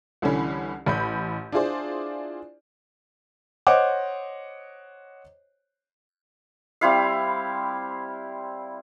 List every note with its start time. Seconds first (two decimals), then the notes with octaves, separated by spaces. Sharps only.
0.22 C2 D3 E3 C#4 B5
0.86 A1 B5 G6
1.52 D4 E4 F4 G#4 C5 D5
3.67 C5 C#5 D#5 F#5 D6
6.81 G3 C4 E4 F5